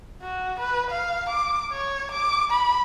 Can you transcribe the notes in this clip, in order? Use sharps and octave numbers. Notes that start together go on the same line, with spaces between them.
F#4
B4
F5
D6
C#5
D6
B5